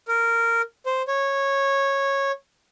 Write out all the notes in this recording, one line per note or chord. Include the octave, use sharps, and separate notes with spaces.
A#4
C5
C#5